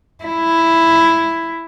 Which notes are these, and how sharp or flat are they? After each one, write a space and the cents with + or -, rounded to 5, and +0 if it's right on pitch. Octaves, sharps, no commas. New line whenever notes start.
E4 +5